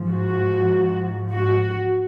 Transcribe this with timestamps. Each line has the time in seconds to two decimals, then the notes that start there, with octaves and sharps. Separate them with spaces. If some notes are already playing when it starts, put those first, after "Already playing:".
Already playing: G#2 F3
0.09 F#4
1.32 F#4